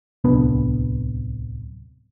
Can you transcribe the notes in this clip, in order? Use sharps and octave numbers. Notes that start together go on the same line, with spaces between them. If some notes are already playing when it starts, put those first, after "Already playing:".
D1 C2 B3 D4